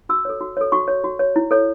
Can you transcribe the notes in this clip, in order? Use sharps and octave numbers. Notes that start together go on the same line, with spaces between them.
F#4 E6
A4 C#5
F#4
A4 C#5
F#4 C#6
C#5
F#4
C#5
E4
A4 C#5